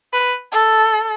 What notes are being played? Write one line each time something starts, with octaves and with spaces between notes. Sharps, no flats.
B4
A4